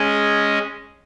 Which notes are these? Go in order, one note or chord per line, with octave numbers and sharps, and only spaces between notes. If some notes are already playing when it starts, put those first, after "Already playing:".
Already playing: G#3 C#4 G#4 D#5